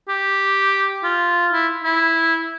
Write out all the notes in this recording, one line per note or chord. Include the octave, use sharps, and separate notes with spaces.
G4
F4
E4
E4